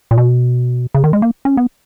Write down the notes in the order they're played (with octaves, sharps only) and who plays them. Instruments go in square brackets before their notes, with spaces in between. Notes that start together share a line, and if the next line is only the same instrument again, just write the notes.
[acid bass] A#2
B2
C#3
D#3
G#3
A#3
C#4
B3